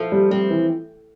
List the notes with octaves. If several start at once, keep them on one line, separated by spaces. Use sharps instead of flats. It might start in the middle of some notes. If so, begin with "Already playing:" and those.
Already playing: F3 A3
G3
G3 C4
E3